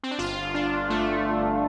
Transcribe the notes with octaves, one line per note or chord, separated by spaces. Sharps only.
C4
D4
G1 F4
G1
D4
G1
G1 A3
G1
G1